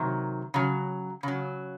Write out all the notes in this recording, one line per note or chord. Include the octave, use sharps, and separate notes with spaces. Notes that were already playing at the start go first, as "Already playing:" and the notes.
Already playing: C3 D#3 F#3
C#3 F#3
C#3 F#3